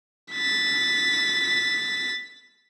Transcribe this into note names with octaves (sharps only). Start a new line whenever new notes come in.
A6 B6